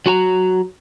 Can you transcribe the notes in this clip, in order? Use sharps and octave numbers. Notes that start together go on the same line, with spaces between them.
F#3 F#4 A5 A#5